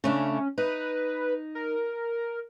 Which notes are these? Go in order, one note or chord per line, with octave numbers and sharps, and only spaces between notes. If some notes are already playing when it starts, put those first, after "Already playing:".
C#3 A3 C#4 D4
D#4 B4
A#4